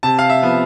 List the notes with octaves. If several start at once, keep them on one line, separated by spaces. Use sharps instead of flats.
C3 A5
F5
E5
F3 B3